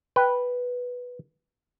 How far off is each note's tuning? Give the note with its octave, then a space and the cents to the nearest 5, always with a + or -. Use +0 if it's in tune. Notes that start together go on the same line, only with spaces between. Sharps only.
B4 -5 G5 +0